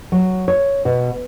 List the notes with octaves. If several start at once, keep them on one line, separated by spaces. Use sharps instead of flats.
F#3
C#5
B2